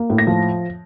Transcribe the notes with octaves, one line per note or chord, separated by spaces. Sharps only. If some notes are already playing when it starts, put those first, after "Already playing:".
Already playing: A#3
A2
A#6
F3